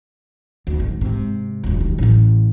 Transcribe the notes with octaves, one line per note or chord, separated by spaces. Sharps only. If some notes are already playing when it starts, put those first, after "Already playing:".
D2
G#1
G#2 C3
E1 C#2
D#2
A1 A2